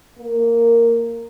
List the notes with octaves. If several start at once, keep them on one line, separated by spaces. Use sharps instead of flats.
A#3